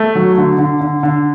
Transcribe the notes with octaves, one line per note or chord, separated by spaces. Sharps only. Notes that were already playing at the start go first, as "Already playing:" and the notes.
Already playing: A3
F#3
D3
D3
D3
D3